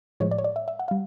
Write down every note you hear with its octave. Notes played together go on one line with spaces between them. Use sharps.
A2 F3 G#3 C#5
D5
C#5
D5
E5
E5
F#5
G3 F5